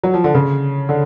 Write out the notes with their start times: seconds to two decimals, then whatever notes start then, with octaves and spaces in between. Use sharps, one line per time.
0.03 F#3
0.14 F3
0.24 D3
0.35 C#3
0.89 D3